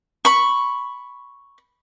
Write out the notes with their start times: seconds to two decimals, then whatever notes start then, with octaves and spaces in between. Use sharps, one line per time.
0.25 B5 C#6